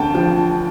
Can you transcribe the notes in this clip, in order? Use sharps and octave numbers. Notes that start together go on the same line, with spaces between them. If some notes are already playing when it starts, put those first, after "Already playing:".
Already playing: D2 G5 A5
F3